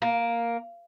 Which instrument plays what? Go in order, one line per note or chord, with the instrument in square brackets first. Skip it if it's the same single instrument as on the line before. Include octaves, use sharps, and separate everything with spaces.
[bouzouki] A#3